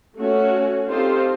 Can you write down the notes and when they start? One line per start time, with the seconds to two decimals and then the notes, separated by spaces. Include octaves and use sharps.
0.18 A3 C#4 F#4
0.88 C4 D#4 F4 G4 A4 C5